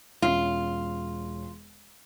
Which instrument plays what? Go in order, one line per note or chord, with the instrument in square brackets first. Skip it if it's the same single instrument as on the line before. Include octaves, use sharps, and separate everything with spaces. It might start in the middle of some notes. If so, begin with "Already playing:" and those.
[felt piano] E1 C#4 [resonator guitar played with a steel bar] F4